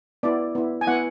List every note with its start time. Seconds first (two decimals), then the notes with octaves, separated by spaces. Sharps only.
0.23 B3 E4 D5
0.55 B3 E4
0.81 G#5
0.87 B3 E4 F#5